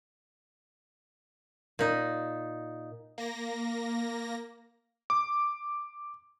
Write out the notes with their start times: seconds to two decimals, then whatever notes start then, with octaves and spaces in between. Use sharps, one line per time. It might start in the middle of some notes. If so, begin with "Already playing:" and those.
1.79 A#2 D#4
3.18 A#3 A#6
5.10 D6